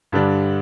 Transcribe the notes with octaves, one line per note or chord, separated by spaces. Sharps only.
G2 D3 G3 D4